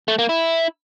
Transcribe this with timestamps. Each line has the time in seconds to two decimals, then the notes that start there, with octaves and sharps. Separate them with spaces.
0.08 A3
0.19 A#3
0.29 E4